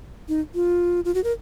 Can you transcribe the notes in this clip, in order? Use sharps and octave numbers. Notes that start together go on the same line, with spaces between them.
D#4
F4
F4
F#4
A#4